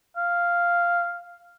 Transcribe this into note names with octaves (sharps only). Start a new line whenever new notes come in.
F5